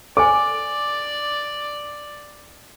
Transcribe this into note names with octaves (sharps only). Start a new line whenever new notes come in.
A4 C5 D5 G#5 D6